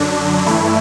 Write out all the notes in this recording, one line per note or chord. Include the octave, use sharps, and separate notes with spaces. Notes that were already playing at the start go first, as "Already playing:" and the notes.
Already playing: F#2 D3 F#3 D4
G2 E3 A3 E4